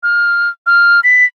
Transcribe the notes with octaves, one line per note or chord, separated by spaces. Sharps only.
F6
F6
B6